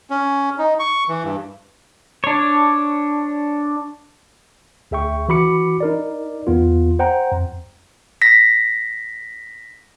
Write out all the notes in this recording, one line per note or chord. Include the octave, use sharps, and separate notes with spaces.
C#4
D#4
C#6
E3
G2
D4 C#5
D2 G#4 E5 G5 C#6
E3 F#4 B5 D6 C#7
D#4 A#4 D5
E2 B3 F4
C5 F#5 G5 A#5
F2
A#6 B6